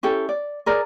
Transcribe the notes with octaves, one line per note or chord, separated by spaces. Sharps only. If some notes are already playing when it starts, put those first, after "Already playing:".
C#4 E4 G4 A4
D5
G#4 A#4 D5